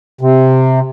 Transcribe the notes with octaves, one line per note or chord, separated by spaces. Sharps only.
C3